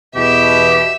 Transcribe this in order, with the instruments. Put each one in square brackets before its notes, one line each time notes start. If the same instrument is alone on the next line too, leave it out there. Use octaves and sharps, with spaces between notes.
[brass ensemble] E2 B2 [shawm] G4 [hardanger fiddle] E5